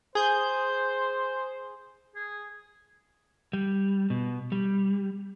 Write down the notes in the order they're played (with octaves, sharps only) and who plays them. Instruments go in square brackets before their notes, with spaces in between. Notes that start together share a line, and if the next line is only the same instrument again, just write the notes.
[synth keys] G#4 G6 [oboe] C5
[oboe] G#4
[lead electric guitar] G3
B2
G3